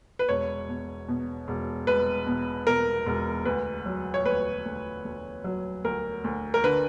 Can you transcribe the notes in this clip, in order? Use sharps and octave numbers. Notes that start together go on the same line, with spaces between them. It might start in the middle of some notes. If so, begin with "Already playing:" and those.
B4
E1 C#5
B2
B2
E1
E1 B4
B2
B2 A#4
E1
D2 B4
F#3
C#5
D2 B4
D2
D2
F#3
D2 A#4
D2
A#4
D3 B4